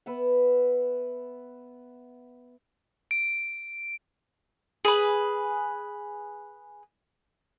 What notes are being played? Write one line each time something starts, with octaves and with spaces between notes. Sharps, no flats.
B3 B4 E5 F#5
D7
G#4 B4